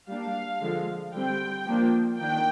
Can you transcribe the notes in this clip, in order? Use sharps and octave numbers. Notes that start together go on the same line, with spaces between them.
G3 A#3 D4 F5
D3 F3 G#3
D3 G3 C4 G5
F3 A#3 D4
D#3 A#3 D4 G5